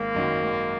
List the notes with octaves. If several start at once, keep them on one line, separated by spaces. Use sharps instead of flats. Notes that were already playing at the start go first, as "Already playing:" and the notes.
Already playing: G#1 A#3
F#2 D#3 F#3
G#1